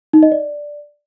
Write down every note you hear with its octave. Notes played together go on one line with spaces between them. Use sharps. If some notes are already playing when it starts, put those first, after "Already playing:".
D#4
D#5
D5